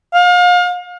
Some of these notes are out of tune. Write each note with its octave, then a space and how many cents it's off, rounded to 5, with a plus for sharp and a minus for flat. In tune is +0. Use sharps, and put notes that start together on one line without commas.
F5 +35